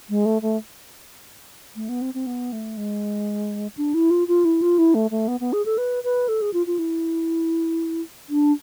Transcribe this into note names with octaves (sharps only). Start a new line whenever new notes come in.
G#3
A3
A3
A3
B3
C4
C4
B3
A3
G#3
D4
E4
F4
F4
E4
F4
E4
A3
A3
B3
B3
G#4
A4
B4
B4
A4
G#4
F4
F4
E4
D4